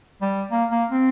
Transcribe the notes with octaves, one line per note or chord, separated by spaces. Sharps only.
G3
A#3
A#3
C4